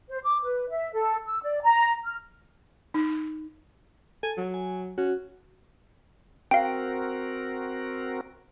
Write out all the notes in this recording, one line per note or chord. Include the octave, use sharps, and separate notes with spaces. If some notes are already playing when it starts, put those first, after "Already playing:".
C5
D6
B4
E5
A4
E6
D5
A#5
F6
D#4
A4 G#5
F#3
G#5
C#4 F#4
C4 F#4 A#4 F5 G5